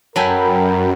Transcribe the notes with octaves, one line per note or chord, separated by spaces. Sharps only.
F#2 F#3 A4 A#4 G5 G#5 B5